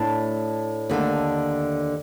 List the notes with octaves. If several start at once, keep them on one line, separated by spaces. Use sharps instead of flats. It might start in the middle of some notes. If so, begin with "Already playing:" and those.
Already playing: A2 A3 D4
D#2 D3 A3